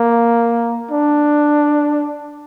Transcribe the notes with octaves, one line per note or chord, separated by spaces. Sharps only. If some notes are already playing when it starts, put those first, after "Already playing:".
Already playing: A#3
D4